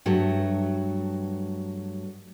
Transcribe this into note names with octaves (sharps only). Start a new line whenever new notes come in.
G2 F#3 A3